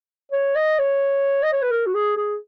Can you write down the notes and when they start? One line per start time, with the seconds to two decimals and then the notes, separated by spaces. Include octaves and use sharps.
0.32 C#5
0.56 D#5
0.79 C#5
1.43 D#5
1.52 C#5
1.62 B4
1.71 A#4
1.86 F#4
1.94 G#4
2.17 G#4